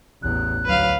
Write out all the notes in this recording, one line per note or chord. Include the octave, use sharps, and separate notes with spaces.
A1 E2 F#6
D2 F#3 B4 F5